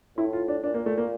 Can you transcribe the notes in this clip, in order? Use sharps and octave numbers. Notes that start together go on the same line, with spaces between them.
A2 E4
F4
D4
A#2 D4
A#3
A3
A#3